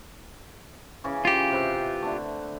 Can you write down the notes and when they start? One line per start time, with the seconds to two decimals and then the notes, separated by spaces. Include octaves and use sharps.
1.04 C#3 E3 C#4
1.25 F4 G4
1.51 C3 B4 E5
2.02 D3 A3